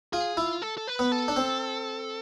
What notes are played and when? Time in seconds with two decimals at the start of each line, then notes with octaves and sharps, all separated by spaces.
0.13 F4 G#4
0.37 E4 F4
0.62 A4
0.78 A4
0.87 B4
0.99 B3
1.12 A4
1.28 D4
1.36 C4